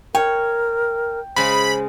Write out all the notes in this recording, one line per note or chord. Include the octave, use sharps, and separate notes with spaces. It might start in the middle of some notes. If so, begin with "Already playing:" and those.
A#4 C#5 G5
C#3 G#3 C5 B5